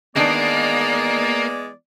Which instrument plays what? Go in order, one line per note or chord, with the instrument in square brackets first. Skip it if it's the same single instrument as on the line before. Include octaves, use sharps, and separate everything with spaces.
[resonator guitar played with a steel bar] D#3 D4 [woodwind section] E3 B3 D5 [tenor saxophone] G#3 [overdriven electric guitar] A#3